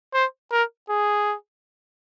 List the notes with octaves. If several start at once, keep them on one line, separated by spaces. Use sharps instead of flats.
C5
A#4
G#4